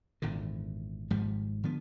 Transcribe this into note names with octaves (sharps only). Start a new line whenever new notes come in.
G#1 E2 A#2 D3
G#1 G#2 F3 G3
D3 F3 B3